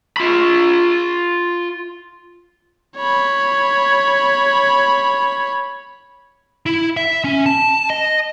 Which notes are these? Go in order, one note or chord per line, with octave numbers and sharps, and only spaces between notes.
F4 B5
C#5 B5
E4
E5
C#4
A5
D#5